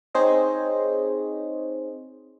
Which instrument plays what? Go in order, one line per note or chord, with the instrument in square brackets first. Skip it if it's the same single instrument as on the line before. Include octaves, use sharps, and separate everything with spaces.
[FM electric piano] C4 D#4 G#4 C5 C#5 D#5